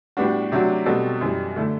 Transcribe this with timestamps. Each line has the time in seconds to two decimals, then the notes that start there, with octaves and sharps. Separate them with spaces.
0.17 A2 G3 B3 D4 F#4
0.52 C3 F#3 A3 D4 F#4
0.86 B2 G3 C4 F#4 A4
1.21 F#2 E3 G3
1.56 D3 A3 E4 A4